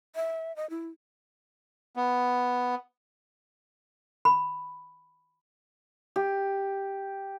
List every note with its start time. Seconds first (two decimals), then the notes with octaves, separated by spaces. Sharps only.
0.16 E5
0.56 D#5
0.70 E4
1.96 B3
4.25 B5
6.16 G4